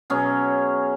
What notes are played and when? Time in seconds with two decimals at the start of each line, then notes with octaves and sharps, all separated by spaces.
0.10 B2 F#3 C#4 G#4